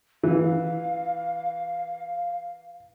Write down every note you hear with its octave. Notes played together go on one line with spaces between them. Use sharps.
E3 F5